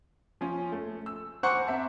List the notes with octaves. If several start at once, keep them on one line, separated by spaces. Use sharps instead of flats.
F3 C#4
A3
E6
C5 F#5 G#5 A#5 C#6 D6
C4 E5 A5